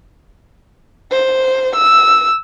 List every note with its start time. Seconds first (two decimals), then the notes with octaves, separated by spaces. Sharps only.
1.12 C5
1.75 E6